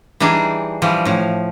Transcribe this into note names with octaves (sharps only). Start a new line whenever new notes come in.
E3 G3 D4 D#4 G#4
E3 F3 G3
A2 F3